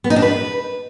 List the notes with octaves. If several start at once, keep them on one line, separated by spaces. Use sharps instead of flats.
B3
D#4
D4
B4